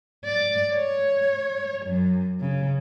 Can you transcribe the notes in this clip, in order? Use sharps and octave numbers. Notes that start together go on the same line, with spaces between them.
D5
C#5
F#2
C#3